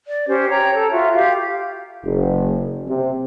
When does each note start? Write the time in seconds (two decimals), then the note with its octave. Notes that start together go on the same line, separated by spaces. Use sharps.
0.07 D5
0.27 C#4 G4 C5
0.50 C#5 G5 A#5
0.74 A4
0.91 F4 F#4 E5
1.15 G4 F5
2.04 F#1
2.87 C3